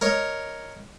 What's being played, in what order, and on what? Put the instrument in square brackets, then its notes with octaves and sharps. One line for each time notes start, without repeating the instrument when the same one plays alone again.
[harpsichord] A#4 C#5 D#5